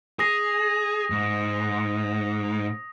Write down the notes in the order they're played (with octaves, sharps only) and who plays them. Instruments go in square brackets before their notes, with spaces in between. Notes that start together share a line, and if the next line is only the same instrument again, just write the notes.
[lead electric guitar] G#4 [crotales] D#6 A#6
[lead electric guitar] G#2